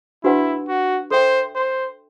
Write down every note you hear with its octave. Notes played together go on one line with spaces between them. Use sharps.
D4 E4 F#4 B4 F#5
F#4
A4 C5 E5 G5
C5